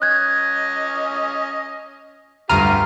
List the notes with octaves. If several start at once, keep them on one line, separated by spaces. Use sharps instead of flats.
C#4 D#5 F#6 G#6
D2 G2 F4 G4 A#5 F6 D#7